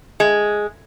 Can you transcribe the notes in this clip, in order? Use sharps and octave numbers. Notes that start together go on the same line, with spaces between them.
G#3